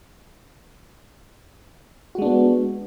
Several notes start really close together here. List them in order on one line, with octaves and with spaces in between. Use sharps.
F#4 G#3 D4 B3